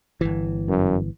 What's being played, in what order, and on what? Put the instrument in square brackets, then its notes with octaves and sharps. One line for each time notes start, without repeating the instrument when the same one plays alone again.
[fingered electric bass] G1 C2 E3
[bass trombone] F#2